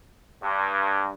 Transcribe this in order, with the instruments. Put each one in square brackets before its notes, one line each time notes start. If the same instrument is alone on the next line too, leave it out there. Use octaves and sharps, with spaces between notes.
[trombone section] G2